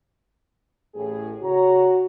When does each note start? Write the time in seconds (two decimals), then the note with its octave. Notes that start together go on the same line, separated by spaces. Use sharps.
0.94 A1 A2 G#4
1.42 C#3 F#4 C#5 A#5